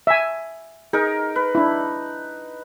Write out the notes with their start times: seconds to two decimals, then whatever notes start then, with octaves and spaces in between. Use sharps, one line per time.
0.07 E5 G#5
0.93 D#4 G#4 A#4
1.36 B4
1.55 D4 E4